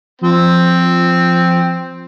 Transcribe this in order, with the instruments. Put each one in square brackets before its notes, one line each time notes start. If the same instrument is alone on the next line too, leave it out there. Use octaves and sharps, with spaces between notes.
[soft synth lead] F3 [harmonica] C4